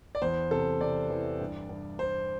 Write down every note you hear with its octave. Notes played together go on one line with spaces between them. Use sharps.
D5
E2 C5
C3 A4
C3 D5
E3
G2
G2
G2 C5